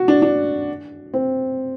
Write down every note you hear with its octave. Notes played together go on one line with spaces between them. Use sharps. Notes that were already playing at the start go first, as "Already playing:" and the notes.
Already playing: F#4
D4
D4
C4